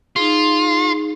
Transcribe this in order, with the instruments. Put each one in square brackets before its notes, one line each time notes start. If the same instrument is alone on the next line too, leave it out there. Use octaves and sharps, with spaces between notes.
[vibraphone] D#4 G#4 [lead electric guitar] F4